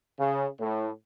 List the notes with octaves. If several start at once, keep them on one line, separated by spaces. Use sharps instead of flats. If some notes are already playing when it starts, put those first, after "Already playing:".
C#3
A2